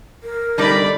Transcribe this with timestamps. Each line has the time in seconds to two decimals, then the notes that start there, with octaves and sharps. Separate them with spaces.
0.23 A#4
0.58 D3 G3 D#4 D5 B5